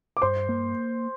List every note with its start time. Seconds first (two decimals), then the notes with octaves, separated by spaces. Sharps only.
0.17 D6
0.22 G2 C5 C6
0.49 A#3